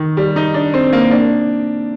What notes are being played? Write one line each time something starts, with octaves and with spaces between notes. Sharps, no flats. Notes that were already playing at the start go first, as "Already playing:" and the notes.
Already playing: D#3
G3
D#4
D4
C4
A#3
D4